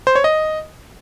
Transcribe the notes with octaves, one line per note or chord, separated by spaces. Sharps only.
C5
C#5
D#5